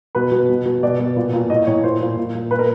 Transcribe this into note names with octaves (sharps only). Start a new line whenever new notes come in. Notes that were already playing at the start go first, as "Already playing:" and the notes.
B2 B4
B2
B2
B2
B2 D5
B2
A#2
A#2
A2 D#5
A2 C#5
A#2 C5
A#2
A#2
A#2
A#2 B4
A#4